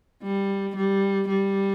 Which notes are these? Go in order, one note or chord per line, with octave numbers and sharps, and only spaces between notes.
G3
G3
G3